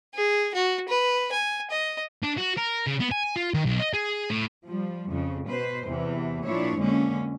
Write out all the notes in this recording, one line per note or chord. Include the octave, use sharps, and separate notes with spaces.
G#4
F#4
B4
G#5
D#5
D4
F#4
A#4
C#3
B3
G#5
F4
D#3
B1
D#5
G#4
A2
F3 G3
F2 C#3
B2 B4 C5
E2 C3 E3
A#2 F3 D4 E4 C#5
F2 D3 G#3 A#3 C#4